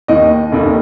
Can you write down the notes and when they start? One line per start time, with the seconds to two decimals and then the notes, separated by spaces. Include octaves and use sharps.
0.08 D#2 D#3 D#5
0.52 F1 D#2 D#3